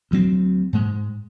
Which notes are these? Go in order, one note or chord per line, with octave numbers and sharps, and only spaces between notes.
D2 F#3 C4
G#2 G#3